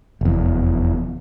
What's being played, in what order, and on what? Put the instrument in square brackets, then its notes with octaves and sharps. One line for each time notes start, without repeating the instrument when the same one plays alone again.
[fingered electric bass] F1 E2